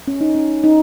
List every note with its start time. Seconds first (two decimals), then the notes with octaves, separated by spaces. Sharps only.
0.08 C#4
0.21 D#4
0.35 C#4
0.64 D#4